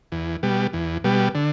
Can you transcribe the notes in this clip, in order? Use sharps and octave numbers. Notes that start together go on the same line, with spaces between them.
E2
B2 G3
E2
B2 G3
D3